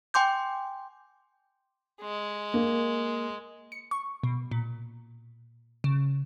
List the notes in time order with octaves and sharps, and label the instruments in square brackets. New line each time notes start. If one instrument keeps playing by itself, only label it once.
[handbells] G5 G#5 C6 D6 G6
[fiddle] G#3
[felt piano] A#3
[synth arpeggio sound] C#7
C#6
B2
A#2
C#3